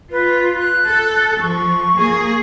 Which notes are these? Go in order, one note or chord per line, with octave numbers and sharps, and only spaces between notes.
F4 B4
F#6
A4
F3 C#6
A#3 G#4